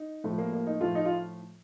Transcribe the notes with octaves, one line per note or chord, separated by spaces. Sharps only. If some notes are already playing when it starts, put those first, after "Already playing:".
Already playing: D#4
A2 F3 A3
A#3
A#3
D#4
A2 F3 A3 F4
D#4
F4